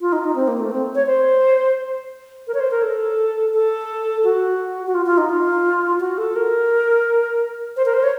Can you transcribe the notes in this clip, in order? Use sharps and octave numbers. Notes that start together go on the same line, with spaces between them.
F4
D#4
D#4
C4
A#3
A3
C4
C#5
C5
A#4
C#5
C5
A#4
A4
A4
F#4
F#4
F4
F4
D#4
F4
F#4
A4
A#4
C5
A#4
C5
C#5